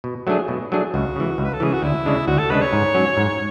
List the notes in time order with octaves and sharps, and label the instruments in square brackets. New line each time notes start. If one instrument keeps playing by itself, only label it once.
[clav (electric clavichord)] B2
F#3 A3 D4 G#4
B2
F#3 A3 D4 G#4
[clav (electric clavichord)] C#2 [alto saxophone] F#4
[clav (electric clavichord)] C#3 E3
C#2
[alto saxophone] B4
A4
[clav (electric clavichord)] C#3 E3 [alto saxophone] G#4
[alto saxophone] F#4
[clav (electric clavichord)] D2 [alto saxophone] E4
[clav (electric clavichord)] C#3 G#3 D4
[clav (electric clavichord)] D2 [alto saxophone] F#4
[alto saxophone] A4
[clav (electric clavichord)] C#3 G#3 D4 [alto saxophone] B4
[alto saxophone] C#5
[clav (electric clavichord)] G#2
F#3 C#4
G#2